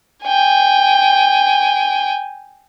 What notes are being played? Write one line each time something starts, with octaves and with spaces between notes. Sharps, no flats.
G5 G#5